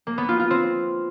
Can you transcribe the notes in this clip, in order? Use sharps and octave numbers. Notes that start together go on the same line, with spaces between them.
A#3
B3
F4
F4
C4